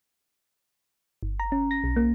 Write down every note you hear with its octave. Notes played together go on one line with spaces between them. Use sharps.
G1
A#5
C#4
A#6
B1
A#3